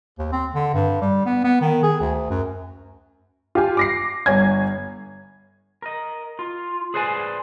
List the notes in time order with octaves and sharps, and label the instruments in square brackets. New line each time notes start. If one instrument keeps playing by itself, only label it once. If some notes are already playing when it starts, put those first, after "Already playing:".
[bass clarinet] D#2
C4
D3
G2
G3
B3
B3
D#3
G#4
D2
F#2
[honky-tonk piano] F4 G4 G#5
D6 A#6 C7
G1 C#5 G#5 G#6
[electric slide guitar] A#4 D#5
F4
G#4 B4 C5 D5 G#5